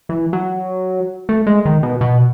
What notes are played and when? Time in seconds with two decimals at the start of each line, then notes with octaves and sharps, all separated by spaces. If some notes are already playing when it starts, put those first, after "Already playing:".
0.09 E3
0.33 F#3
1.29 A3
1.47 G#3
1.65 D#3
1.83 B2
2.01 B2